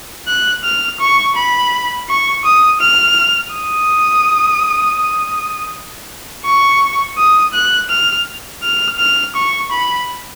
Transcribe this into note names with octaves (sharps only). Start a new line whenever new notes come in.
F#6
F6
C#6
B5
C#6
D#6
F6
D#6
C#6
D#6
F#6
F6
F6
F6
C#6
B5